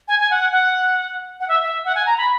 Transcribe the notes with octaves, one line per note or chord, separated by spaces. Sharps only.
G#5
G#5
F#5
F#5
F#5
E5
E5
F#5
G#5
A#5
B5